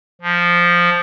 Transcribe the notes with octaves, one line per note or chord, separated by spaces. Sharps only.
F3